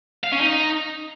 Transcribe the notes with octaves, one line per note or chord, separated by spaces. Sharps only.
F5
C#4
D#4